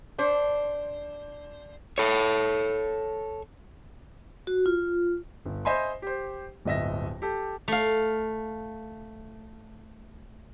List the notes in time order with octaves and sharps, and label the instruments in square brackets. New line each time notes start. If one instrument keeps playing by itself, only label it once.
[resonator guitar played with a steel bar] D4 C5
[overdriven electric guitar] A4 C#5
[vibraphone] F#4
F4
[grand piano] G1
C5 D#5 E5 G#5 B5 C6
G4 C5
D1 G1 D#5 E5 A#6
G4 A4
[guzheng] A3 F5